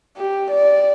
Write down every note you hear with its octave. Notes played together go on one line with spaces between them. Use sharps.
G4
D5